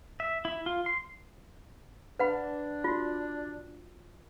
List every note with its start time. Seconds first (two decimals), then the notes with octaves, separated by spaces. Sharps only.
0.20 E5
0.45 E4
0.66 F4
0.86 C6
2.19 D4 B4 F#5 B5
2.84 F4 F#4